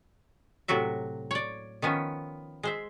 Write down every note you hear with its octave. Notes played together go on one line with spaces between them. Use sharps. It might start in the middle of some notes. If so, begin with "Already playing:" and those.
A2 C3 F#3 F#4 E5
C#5 D5
D#3 F3 B3 C#4
G#3 C5 E5